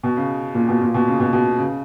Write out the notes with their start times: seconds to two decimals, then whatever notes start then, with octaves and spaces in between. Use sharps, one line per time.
0.03 B2
0.17 C#3
0.55 A#2
0.68 B2
0.81 A#2
0.94 B2
1.07 C#3
1.20 B2
1.33 B2
1.58 C#3